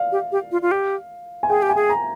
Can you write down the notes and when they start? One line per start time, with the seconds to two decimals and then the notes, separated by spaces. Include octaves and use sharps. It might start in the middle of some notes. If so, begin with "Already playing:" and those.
Already playing: D5 F5
0.12 G4
0.32 G4
0.52 F4
0.62 F4
0.71 G4
1.43 G#5
1.49 G#4 G5
1.62 G4
1.69 G#5
1.75 G#4
1.89 A#5